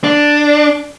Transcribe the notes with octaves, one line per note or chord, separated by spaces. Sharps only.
D4